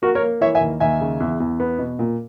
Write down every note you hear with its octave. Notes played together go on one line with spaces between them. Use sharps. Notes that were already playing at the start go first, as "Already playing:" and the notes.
A#3 F#4 A#4
A#4 C#5
A#3
E3 C#5 E5
E5 G#5
D#2
D#2 E5 G#5
C#3
E2
E2
B3
B2
A#2